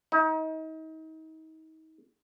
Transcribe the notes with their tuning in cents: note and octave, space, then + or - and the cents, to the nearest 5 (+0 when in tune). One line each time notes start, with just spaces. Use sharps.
D#4 +35